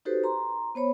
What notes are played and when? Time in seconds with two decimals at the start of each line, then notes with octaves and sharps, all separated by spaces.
0.05 D#4 F#4 G4 A4 B4 C5
0.24 A#5 C6
0.75 B3 C5 C#5 B5